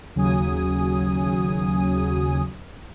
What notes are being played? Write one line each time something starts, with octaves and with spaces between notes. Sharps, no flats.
D#2 C#3 F#3 G#5 D#6